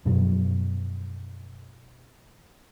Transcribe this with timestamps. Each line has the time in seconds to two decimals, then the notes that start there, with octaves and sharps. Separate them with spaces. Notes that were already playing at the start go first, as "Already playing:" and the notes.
0.05 F#2 B2 F3 F#3